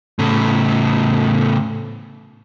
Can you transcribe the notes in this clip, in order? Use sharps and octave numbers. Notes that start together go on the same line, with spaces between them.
A2 C#3